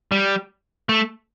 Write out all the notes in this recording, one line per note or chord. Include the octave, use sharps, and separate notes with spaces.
G3
A3